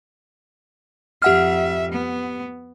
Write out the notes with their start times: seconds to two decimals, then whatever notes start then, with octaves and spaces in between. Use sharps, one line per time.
1.22 F2 G4 E5 F#5 F6
1.92 B3